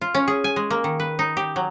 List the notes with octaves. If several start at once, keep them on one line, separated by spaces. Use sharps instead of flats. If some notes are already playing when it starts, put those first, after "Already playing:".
F4
C#4
G#4
G#5
G#3
A#3
D#3
B4
D#4
G4
F#3